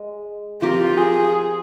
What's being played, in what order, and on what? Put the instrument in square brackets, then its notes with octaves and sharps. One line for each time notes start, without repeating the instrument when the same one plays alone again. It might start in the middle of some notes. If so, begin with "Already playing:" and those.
Already playing: [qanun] G#3
[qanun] F3 C4 G4 A#4 [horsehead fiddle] F4
[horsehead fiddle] G#4